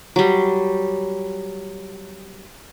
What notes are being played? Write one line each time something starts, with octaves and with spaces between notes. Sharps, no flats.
F#3 G3